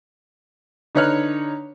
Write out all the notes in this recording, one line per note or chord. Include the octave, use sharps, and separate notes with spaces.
D3 D#4 B4 C#5 F6 F#6